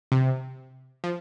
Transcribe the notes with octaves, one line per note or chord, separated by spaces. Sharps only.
C3
F3